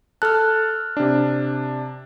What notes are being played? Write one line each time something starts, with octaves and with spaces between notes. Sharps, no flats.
A4 A5 F6 F#6
C3 D4